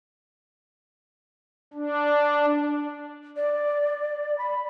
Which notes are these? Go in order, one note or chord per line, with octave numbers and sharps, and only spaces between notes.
D4
D5
B5